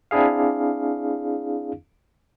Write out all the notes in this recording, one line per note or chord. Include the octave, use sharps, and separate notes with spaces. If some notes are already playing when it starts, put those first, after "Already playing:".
C4 D4 E4 G#4 F5